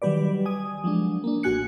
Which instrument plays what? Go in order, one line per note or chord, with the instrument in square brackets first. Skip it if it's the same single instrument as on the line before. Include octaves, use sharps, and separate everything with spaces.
[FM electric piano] D#3 F#3 G3 G4 B4 D5
G#5 D#6
F3 F#3 G#3 D4
A#3 D4
A1 A2 F#4 G#5 F#6 C#7